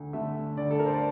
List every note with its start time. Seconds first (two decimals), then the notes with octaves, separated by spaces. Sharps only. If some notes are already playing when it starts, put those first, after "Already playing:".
Already playing: D2
0.13 D3 A3 E5
0.57 D2 D5
0.71 A4
0.79 A#4
0.86 C5
0.94 D5